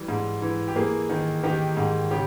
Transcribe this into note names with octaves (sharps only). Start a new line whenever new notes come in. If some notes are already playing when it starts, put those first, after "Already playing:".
Already playing: E3 G3
G#2
E3
G4
A#3 G#4
D#3
D#3 G4
G#2
C#3 G4